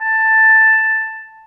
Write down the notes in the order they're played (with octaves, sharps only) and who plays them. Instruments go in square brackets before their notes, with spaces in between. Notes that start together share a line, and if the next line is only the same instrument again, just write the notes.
[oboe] A5